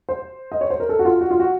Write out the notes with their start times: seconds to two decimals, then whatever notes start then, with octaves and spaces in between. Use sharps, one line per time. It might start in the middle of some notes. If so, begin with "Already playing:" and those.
0.09 C5
0.52 D#5
0.61 C#5
0.70 C5
0.80 A#4
0.89 A4
0.99 F#4
1.05 F4
1.21 F#4
1.31 F4
1.40 F#4